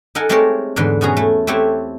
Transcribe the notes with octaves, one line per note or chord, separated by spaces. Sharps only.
D#4 A4 A#4 F#5 G#5
G#3 A3 C4 G4 A#4 C#5
E2 G#2 D3 B4 C6
B2 B3 C#4 F#4 G#4 A#5
A3 E4
A3 C4 E4 G4 C#5 F#5